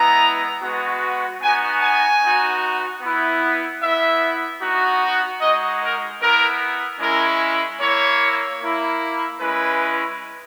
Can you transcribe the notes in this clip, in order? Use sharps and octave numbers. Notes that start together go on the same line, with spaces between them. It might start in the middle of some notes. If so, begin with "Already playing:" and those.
Already playing: G#3 B3 E4 A#5
G#3 B3 F#4
B3 D#4 F#4 G#5
G#5
B3 D#4 F#4
B3 E4
B3 E4 E5
B3 D#4 F#4
G#3 D#4 F#4 D#5
A#4
B3 E4 A#4
G#3 C#4 E4 A#4
A#3 E4 C#5
A#3 E4
G#3 C#4 E4 B4